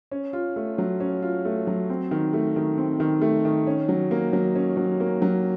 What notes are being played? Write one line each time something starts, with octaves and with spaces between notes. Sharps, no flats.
C#4
F4
A3
F#3
C#4
F4
A3
F#3
C4
D#3
A3
D#3
C4
D#3
A3
D#3
C#4
F#3
A#3
F#3
C#4
F#3
A#3
F#3